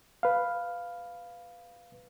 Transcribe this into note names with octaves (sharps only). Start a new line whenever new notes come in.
B4 F5